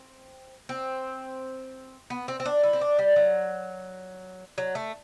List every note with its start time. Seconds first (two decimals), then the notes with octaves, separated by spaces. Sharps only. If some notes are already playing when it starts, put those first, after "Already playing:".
Already playing: C4
0.69 C4
2.10 B3
2.28 C4
2.40 C4
2.45 D4
2.63 E4
2.73 C4
2.81 D4
2.99 G3
3.16 F#3
4.58 F#3
4.75 A3